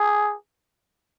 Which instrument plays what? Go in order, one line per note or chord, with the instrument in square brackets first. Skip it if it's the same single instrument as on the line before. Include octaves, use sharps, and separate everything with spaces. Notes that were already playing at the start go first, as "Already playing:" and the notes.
Already playing: [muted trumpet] G#4